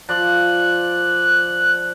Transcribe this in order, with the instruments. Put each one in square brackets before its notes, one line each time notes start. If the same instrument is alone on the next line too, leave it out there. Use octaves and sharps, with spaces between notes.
[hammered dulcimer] F3 D5 [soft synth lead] F#6